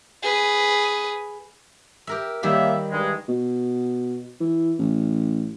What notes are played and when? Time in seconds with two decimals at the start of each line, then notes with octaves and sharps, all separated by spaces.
0.23 G#4 B4
2.07 G4 A#4 E5
2.43 D#3 G3 A#3 G4 C#5 E5
2.92 G2 G#3
3.28 B2
4.40 E3
4.79 A1